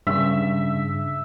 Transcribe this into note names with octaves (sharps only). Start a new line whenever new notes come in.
G2 C#3 E5